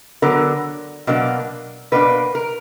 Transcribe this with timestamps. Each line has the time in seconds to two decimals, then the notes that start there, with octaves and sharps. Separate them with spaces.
0.22 D3 F#3 B3 A#4
1.07 B2 F#3 A#3 D4
1.92 B2 A#3 D4 B4
2.35 A#4